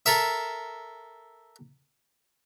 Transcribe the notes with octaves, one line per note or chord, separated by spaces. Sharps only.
A4 A#4 E5